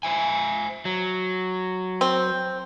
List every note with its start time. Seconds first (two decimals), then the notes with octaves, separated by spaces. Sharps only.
0.03 C5 E5 G#5
0.85 F#3
2.01 C4